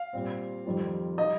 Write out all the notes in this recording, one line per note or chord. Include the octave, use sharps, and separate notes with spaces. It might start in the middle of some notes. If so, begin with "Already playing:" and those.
Already playing: F5
A#2 G3 C4
F2 D#3 G3 C4 F4
G3 D#4 D#5